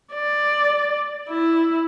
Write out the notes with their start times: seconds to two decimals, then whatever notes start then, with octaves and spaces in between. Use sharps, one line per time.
0.14 D5
1.29 E4